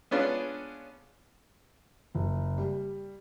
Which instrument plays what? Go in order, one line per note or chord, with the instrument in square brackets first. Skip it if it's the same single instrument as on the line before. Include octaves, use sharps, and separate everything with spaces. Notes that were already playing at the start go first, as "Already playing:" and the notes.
[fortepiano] B3 C#4 D4 F4 G#4
[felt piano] F#1
G3